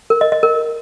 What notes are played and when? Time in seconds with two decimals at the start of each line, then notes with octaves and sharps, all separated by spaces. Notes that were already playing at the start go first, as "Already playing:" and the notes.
0.10 A#4
0.21 D#5
0.32 D#5
0.43 A#4